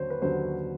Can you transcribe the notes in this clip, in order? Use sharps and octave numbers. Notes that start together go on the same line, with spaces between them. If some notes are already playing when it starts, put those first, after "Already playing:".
Already playing: D#2 D3 F#3 C5 C#5
B4
D#2 D3 F#3 C5